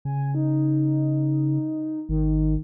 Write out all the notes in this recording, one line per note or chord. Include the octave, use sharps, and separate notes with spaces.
C#3 G#5
D#4
G#1 D#3